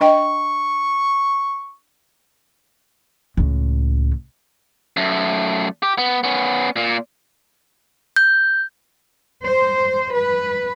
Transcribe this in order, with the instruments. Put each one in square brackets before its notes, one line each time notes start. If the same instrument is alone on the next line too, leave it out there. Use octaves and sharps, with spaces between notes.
[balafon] D4 D#5 G5 [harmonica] C#6
[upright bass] C#2 A2
[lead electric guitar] F#2 A3
G4
B3
B3 C#4
A#2
[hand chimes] G6
[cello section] C5
B4